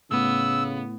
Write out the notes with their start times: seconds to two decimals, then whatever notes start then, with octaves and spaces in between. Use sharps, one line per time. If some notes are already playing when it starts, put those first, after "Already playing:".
0.11 A2 C#3 B3 E6